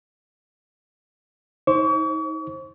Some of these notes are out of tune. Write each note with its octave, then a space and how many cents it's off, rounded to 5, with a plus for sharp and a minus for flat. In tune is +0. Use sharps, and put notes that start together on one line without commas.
D#4 +30 C5 +30 C#6 +40